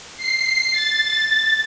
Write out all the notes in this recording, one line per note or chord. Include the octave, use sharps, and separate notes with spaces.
C7
A6